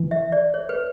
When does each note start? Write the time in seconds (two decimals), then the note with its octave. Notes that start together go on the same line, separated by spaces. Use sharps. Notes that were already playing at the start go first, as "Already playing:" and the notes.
Already playing: E3
0.11 E5
0.32 D5
0.54 C#5
0.69 B4